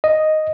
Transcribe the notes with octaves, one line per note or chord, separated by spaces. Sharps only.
D#5